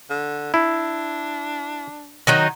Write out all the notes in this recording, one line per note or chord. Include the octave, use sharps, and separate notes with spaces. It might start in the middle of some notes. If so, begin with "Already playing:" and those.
D3
D4 E4
D#3 F#3 D#4